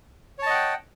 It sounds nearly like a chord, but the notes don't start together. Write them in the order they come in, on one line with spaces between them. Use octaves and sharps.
C#5 A5 D#5 F#5 G5